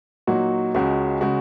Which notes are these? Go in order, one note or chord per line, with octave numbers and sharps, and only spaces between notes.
A#2 F#3 D#4 F#4
C#2 C#3 G#3 F#4
C#3 G#3 F#4